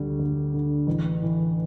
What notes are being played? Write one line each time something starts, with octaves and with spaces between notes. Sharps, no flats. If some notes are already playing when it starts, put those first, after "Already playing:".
Already playing: D2 D3 G3
D2
D3
A1
A2 E3